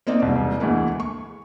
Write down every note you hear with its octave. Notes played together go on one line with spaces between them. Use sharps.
A#3 C4 D#4 D5
E1 C2
D2 E3 G#3 A#3
C#6